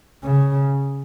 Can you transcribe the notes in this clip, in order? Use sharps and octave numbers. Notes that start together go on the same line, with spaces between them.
C#3